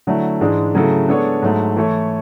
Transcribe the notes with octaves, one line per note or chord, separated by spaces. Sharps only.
D3 F#3 A3 E4
G#2 E3 G#3 D4
C#3 F#3 A3 E4 A4
G#3 B3 D4 A4 C#5
G#2 F#3 A3
E3 A3 E4 A4 C#5